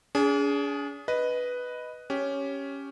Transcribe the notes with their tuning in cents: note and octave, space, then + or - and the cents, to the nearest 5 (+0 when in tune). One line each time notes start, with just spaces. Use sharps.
D4 -45 G#4 +0
B4 +0 D#5 +0
C#4 +0 G4 +0